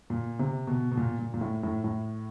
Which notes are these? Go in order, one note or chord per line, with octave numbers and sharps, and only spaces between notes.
A#2
C3
B2
B2
A#2
A#2
A#2
A2
A2
A2